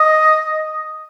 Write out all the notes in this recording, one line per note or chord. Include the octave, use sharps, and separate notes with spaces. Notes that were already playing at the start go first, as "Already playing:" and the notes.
Already playing: D#5